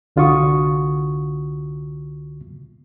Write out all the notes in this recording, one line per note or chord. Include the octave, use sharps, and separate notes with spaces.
C2 D3 F4 F#4 C#6 D#6